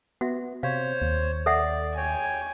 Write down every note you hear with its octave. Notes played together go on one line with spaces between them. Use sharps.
B3 F#4 E5
C3 C5 C#5 F5
D#2
A4 D5 E5 F#5
C#5 G5 G#5